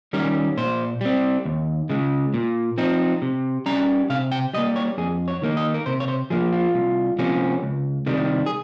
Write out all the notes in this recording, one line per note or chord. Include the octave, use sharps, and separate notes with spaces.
D#3 G3 C#4 A#4
A#2 C5
G3 C4
D#2
C#3 G#3
A#2
F3 C4 D#4
C3
G3 C#4 A#5
C3 F5
G5
G3 A#3 D#5
C#5
F2 G#4
C#5
D#3 A#3 D#4
D#5
A#4
C3 C5
C#5
C5
F3 A#3 G#4
F4
C2
C3 F3 A#3 C#4
C#2
C3 D#3 G3
G#4